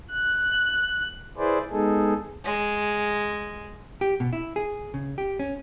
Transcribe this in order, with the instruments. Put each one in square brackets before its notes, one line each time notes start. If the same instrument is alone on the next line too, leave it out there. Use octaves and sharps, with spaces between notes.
[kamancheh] F#6
[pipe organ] E4 G#4 B4 C5 D5
G#3 B3 D#4 G#4 A4
[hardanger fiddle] G#3
[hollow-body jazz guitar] G4
B2
E4
G#4
C#3
G4
C#4